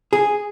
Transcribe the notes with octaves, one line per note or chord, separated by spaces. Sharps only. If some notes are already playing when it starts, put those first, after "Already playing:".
G#4